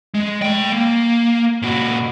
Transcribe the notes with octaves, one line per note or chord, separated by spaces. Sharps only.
G#3
A3 G5
A#3
A#2 F#4